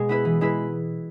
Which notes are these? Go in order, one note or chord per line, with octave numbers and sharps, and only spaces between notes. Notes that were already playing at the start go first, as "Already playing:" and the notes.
Already playing: B2 G#3 F#4 G#4
B3 E4 B4
E3
G#3 E4 B4